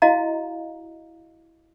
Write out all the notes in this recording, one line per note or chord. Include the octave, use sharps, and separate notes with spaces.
E4 F#4 D#5 F5 A#5